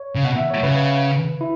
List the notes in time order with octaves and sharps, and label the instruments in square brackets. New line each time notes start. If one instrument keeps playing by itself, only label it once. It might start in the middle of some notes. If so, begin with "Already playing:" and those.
Already playing: [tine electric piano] C#5
[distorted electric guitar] C#3
[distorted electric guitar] B2 [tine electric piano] F#5
[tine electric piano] E5
C#5
[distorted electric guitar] C#3 [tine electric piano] B4
[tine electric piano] E4